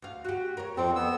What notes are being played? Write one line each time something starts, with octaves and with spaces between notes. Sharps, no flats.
D2 F5
F#4 G4
A#4 C#5
F2 C4 A4 C5 D5
B3 E6